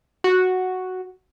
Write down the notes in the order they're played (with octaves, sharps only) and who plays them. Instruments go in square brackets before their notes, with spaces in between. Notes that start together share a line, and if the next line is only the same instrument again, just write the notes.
[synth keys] F#4